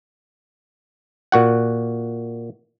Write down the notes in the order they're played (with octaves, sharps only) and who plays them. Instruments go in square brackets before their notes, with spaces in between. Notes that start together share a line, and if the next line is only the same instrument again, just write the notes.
[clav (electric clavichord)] A#2 F#4 F#5